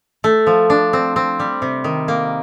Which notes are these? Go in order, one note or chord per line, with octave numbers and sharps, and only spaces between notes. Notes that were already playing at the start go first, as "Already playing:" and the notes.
A3
F3
D4
C4
C4
G3
C3
D#3
A#3